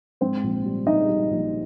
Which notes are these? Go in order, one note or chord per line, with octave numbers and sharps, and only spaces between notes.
G#2 C4 C5
A#1
G3
G3 D#4 D#5
G3
A#1